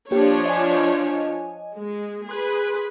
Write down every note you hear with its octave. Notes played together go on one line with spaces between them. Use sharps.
F3 A#3 D4 G4 C#5
D#5 G#5
G#3
G#4 B4 C6 F#6